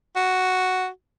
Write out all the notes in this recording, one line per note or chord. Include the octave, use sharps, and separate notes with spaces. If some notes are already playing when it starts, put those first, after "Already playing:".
F#4